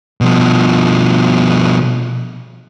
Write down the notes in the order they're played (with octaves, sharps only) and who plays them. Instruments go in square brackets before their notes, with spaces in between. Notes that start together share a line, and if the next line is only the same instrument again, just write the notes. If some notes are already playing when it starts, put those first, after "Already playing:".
[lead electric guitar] B2 F3